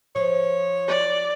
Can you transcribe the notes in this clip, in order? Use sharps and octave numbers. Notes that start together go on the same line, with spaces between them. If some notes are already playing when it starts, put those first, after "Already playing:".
F3 C#5
D5